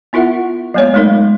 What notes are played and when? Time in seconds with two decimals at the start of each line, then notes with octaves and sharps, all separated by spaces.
0.13 B3 E4 F4 A#4 E5 F#5
0.74 F#3 G#3 A#3 B3 C#5
0.93 F#3 G#3 A3 D#4 A#4